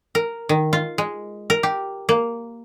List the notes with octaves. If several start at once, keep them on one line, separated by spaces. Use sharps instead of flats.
A#4
D#3
F4
G#3
A#4
G4
A#3